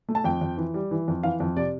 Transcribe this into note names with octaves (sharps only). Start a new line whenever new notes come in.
A3
A5
F2 G5
F2
E3
G3
E3
F2
E3 F5
F2
C3 D5